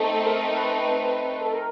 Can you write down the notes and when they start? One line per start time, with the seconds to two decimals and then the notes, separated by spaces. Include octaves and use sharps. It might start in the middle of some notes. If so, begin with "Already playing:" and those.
Already playing: A3 C4 D#4 A4
0.26 A#4
0.57 B4
1.41 A4
1.53 A#4